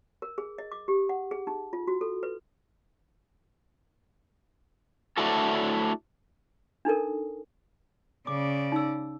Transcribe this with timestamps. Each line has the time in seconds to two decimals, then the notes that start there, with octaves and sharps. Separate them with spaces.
0.22 A#4
0.38 G#4
0.58 D#5
0.72 D6
0.88 G4
1.09 F#5
1.31 G#4
1.47 D#4
1.73 F4
1.87 F#4
2.01 A4
2.23 B4
5.17 A3 D4 E4 F#4 A4
6.85 D4 D#4 A4 A#4
8.27 C#3 D5 D6
8.72 D#4 E6